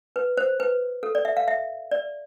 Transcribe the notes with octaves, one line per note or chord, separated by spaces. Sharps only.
B4
C5
B4
A4
D5
E5
F5
E5
D5